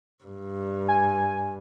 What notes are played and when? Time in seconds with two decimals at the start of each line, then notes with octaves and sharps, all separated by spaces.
0.24 G2
0.88 G#5